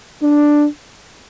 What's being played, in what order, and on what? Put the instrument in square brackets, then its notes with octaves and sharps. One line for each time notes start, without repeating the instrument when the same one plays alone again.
[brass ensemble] D4